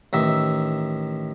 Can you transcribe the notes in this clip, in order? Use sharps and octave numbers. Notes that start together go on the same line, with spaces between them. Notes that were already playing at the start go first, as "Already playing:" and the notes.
A1 D#3 E5